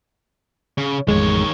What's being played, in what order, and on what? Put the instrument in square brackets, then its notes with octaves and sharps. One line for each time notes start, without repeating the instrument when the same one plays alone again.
[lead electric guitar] C#3
[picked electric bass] A1 F2 G#3 [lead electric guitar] D#3 C#5